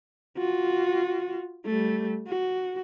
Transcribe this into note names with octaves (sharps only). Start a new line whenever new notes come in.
F4 F#4
G3 A3
F#4